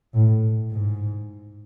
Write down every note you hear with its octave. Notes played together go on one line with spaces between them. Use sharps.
A2
G#2